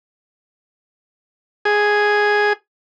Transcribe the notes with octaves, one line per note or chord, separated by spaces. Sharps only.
G#4